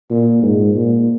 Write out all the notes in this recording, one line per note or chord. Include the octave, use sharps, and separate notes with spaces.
A#2
G#2
A#2